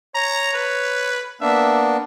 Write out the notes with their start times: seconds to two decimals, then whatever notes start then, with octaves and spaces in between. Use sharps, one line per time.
0.15 C#5 A#5
0.54 B4
1.41 A#3 B3 D4 E5